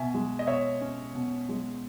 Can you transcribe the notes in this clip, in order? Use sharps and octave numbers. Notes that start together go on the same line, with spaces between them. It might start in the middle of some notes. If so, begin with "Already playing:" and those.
Already playing: B2 E5 G#5
G#3
D#5
B2 C#5 E5
C#4
B2
G#3